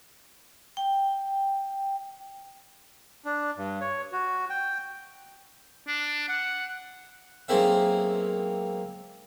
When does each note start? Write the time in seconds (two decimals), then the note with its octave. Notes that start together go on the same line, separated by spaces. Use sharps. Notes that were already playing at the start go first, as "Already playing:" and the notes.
0.77 G5
3.25 D4
3.57 G2
3.81 C#5
4.12 F#4
4.50 G5
5.87 D4
6.28 F#5
7.48 B1 G#3 A#3 C4 E5